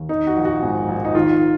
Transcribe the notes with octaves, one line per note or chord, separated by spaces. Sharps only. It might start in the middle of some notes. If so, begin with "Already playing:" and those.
Already playing: D#2
D#3 D#4
F#4
A#1
F#4
G#2
A#1
D#4
D#3 F4